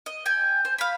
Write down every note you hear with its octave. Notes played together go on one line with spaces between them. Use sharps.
D#5
G5 G#5 G6
C5
F5 B5